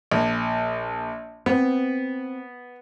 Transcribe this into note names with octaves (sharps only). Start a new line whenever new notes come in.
A#1
B3 C4